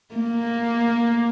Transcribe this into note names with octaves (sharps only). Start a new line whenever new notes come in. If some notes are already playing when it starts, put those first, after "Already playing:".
A#3